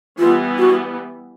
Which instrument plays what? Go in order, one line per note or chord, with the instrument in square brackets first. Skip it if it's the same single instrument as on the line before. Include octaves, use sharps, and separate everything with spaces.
[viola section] E3 G3 B3 [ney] F4
[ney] F#4